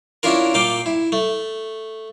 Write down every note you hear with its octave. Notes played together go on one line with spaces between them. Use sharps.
C#4 D4 E4 F4 A#4
A#2 F5 G5 D6
E4
A3